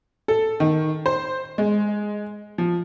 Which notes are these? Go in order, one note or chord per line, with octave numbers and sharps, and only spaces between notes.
A4
D#3
C5
G#3
F3